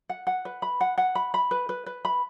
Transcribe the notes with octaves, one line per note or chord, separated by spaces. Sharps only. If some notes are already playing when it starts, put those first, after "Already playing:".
F#5
F#5
B4
B5
F#5
F#5
B5
B5
B4
B4
B4
B5